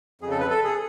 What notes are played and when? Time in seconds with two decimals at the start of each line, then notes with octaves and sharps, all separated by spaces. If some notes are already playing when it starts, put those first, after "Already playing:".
0.21 F2 G#4
0.26 C#3
0.31 A4
0.40 B4
0.51 A4
0.64 G#4